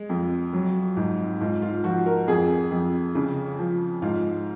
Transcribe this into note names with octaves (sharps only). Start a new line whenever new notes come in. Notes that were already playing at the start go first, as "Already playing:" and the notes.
Already playing: G#3
F2
F#3
G#2
G#2 F4
F4
F3 F#4
A#4
F2 G#4
F2
C#3
F3
G#2 F4